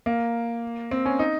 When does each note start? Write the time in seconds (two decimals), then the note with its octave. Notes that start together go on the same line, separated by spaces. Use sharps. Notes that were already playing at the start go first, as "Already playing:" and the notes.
0.06 A#3
0.91 C4
1.06 C#4
1.19 D#4